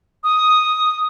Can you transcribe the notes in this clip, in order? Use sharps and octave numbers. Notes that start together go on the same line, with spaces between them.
D#6